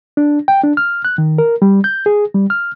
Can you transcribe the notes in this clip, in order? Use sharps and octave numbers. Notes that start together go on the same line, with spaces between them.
D4
G5
D4
F6
F#6
D#3
A#4
G3
G6
G#4
G3
F6